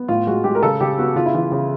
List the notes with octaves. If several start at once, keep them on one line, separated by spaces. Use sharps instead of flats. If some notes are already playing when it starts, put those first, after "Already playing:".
Already playing: B3
A2 F4
G#3 F#4
G#3 G4
A#4
C#3 A4
C#3 G4
B3 F#4
C#3 F4
E4
E3 F4
C#3